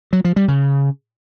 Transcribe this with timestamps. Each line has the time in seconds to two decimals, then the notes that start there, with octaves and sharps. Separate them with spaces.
0.13 F#3
0.25 F3
0.36 G3
0.48 C#3